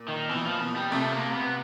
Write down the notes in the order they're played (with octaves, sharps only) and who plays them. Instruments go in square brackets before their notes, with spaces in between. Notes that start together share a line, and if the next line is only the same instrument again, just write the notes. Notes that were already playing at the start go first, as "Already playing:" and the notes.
Already playing: [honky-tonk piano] A#2
[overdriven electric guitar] D#3
[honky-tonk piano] B2 [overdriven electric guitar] E3
[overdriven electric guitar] F3
[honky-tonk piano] B2
[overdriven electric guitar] G3
[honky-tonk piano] C3 [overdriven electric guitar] A3
[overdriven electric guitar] A#3
B3